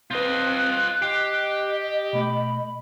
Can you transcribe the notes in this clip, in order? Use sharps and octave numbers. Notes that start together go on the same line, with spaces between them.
C4 F4 B4 D#5 F#6 G6
G4 D#5 C7
B2 A3 B5